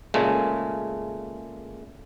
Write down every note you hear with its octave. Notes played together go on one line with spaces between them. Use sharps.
A#2 C#3 G#3 A3